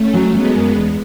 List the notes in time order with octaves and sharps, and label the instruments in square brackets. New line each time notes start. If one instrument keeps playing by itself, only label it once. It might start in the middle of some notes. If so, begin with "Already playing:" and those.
Already playing: [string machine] A3 C#4
[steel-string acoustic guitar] F#3
[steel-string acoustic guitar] F#3 [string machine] G#3 B3
[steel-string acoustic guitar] F#2
E2